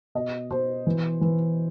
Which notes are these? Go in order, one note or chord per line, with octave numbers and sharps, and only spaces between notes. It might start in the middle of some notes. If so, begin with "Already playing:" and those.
B2 D#5
B2 C5
E3
E3